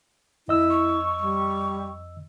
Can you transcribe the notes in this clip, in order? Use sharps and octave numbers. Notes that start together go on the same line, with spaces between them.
F2 E4 D#5 E6
C#6
G3